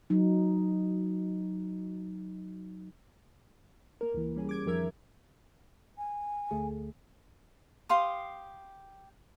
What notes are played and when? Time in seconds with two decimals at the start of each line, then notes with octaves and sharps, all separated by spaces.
0.10 F#3 D#4
4.01 A#3 A#4
4.14 C#2 E3
4.36 G3 C#4 G#4
4.49 D6 G#6 D7
4.66 F2 D#3 F3 A#4 E5 G#6
5.98 G#5
6.51 D2 A3 G#4
7.89 G4 F5 C6 D#6